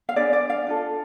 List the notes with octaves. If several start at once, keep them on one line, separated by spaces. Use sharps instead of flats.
F5
D4 G#4 B4 D5
D5
F5
D4 F4 A4